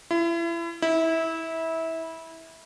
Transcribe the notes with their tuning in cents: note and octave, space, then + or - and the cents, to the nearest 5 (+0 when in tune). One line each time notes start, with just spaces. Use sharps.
E4 +35
E4 -20